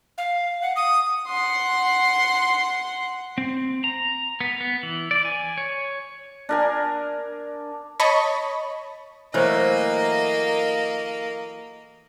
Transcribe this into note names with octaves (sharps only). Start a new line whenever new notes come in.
F5
F#5
D#6
F#5 C6
C4
A#5
B3
B3
E3
D5
G#5
C#5
D4 A#4 G#5
C#5 D#5 A5 B5 C#6
E3 F#3 A3 A#3 C5 D#5